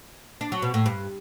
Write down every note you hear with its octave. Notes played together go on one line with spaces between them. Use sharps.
D4
F#3
B2
A2
G2